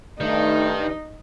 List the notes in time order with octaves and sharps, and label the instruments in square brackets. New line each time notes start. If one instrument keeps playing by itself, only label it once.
[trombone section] G2 [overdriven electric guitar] D#3 [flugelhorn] A3 [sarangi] D#4